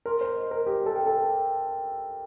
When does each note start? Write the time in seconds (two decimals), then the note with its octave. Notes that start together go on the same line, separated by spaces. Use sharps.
0.06 A#4 C6
0.21 C5
0.36 D#5
0.51 A#4
0.66 G4 A#4
0.86 A4
0.96 G5
1.06 A4